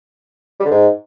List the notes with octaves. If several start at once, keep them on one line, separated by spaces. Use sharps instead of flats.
G3
D3
G#2